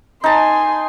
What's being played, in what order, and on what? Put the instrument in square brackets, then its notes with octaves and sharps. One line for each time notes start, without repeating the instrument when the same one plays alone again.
[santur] D#4 A5 [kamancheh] G#5 C6